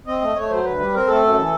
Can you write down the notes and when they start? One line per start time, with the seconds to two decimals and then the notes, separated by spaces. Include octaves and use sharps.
0.07 C4 D#5
0.22 A3
0.36 A3 C#5
0.50 F#3 C5
0.65 D2 B4
0.80 G3
0.94 C4 A#4
1.08 A3 A4
1.23 F#2
1.37 E3